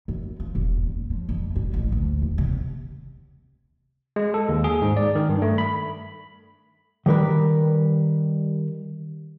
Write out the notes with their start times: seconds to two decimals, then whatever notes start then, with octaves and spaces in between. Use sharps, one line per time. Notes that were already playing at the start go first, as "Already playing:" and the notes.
0.08 F#2
0.40 F3
0.55 E1
0.83 D#1
1.10 F3
1.29 F2
1.56 F#3
1.73 A1
1.92 D2
2.22 D#2
2.38 C3
4.16 G#3
4.34 A4
4.49 D#2
4.64 G#4
4.82 G#2
4.97 D5
5.15 D#3
5.29 G2
5.42 A3
5.58 B5
7.06 D#3 G3 A#4 B4